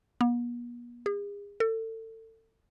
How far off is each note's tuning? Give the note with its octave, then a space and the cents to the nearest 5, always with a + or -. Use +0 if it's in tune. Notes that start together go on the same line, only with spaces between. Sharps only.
B3 -45
G#4 -40
A4 +30